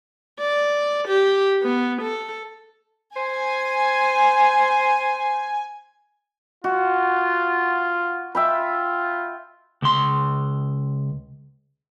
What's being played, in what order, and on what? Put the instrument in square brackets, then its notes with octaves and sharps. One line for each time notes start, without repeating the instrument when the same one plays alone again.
[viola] D5
G4
B3
A4
[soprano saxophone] C5 [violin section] G#5
[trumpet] F4 [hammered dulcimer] F#4
[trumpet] F4 [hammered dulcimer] E5 G5 B5
[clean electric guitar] C#2 C6